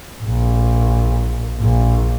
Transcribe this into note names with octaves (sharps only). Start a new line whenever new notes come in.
A#1
A#1